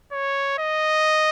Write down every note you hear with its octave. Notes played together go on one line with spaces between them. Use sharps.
C#5
D#5